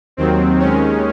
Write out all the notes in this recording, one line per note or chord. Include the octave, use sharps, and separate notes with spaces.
D#2 D#3 F#3 C4
D#2 D#3 G#3 C#4